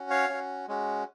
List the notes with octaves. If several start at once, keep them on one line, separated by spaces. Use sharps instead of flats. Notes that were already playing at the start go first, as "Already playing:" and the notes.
Already playing: C#4 F#4
C#5 F5
C#4 F#4
G#3 C#4 F#4